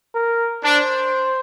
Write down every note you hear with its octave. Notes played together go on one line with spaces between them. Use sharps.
A#4
D4 C5